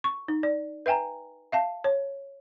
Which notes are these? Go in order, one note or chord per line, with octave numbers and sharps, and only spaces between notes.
C#6
D#4
D5
B4 E5 G5 G#5 A#5
E5 F5 A5
C#5